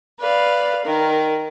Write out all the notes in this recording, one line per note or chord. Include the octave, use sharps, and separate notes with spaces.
B4 D5 F5
D#3 A#4